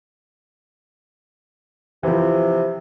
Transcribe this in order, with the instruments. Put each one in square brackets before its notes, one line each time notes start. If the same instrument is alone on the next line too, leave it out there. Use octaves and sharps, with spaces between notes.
[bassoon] C3 [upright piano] E3 F3